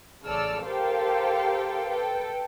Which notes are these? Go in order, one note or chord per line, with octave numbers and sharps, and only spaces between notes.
A1 C#3 A4 D5 E6 F6
G4 A4 A#4 C5 F5 G5
A4 B4 G5